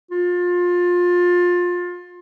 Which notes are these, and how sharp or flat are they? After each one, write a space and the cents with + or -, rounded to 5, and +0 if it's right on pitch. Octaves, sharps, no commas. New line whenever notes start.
F4 +25